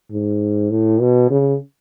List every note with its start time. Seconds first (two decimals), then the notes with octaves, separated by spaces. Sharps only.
0.12 G#2
0.71 A2
1.01 B2
1.30 C#3